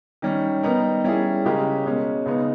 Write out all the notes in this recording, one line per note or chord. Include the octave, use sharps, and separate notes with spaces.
D#3 G3 C#4
G3 B3 D#4 A#4
G3 C#4 E4 G#4
C#3 G#3 C#4 G4 A#4
B2 G#3 C#4
C#3 G#3 B3 D#4